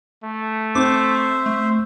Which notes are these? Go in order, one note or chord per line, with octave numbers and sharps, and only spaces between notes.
A3
C4 C5 E5 D6
A3